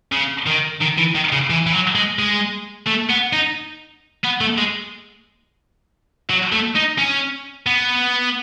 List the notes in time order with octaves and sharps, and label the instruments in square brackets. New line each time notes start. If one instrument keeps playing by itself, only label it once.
[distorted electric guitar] C#3
D#3
D#3
E3
D#3
C#3
E3
E3
F#3
G#3
G#3
A3
B3
D#4
B3
A3
G#3
F#3
A3
D#4
C#4
B3